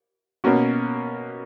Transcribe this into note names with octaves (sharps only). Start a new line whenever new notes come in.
B2 A#3 C#4 F#4